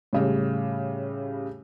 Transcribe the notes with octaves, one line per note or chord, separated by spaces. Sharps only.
A2 C#3 G3